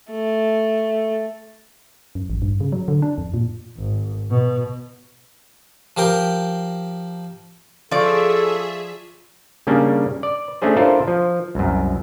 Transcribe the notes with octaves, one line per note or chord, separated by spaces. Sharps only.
A3
F#2
A1
G2
C#3
F#3
D3
D4
F2
A#2
G#1
B2
F3 G4 A#4 G5
F3 G#4 A4 D5 E5 F5 C#6
C#3 G3 A#3 C#4 D4
D5
A3 C#4 D4 G#4 C5
D4 E4 F4 A4 A#4 C5
F3
C2 F#2